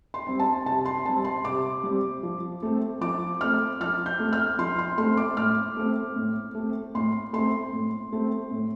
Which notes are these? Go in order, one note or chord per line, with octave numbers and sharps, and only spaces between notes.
C6
G3 C4
A5
C3 A5
C6
G3 C4 A5
C6
C3 D6
G3 C4
F3
A3 C4
F3 D6
A3 C4 F6
F3 F6
G6
A3 C4
F6
F3 C6
C6
A3 C4 C6
D6
A2 F6
A3 C4
A2
A3 C4
A2 C6
A3 C4 C6
A2
A3 C4
A2